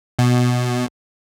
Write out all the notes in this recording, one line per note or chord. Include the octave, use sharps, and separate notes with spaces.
B2